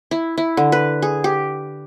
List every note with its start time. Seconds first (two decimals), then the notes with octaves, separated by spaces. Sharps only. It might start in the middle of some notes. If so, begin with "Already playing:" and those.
0.11 E4
0.38 E4
0.57 D3
0.72 B4
1.02 G#4
1.24 G4